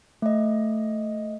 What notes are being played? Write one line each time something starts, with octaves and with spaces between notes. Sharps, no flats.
A3 D#5